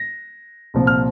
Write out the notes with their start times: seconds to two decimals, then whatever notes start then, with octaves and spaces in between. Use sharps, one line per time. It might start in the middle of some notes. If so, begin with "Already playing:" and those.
Already playing: A#6
0.74 C2 A#2 F3
0.87 F6